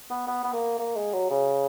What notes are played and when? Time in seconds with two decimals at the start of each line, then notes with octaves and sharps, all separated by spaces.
0.10 B3
0.27 B3
0.44 B3
0.53 A#3
0.79 A#3
0.96 G#3
1.13 F#3
1.30 C#3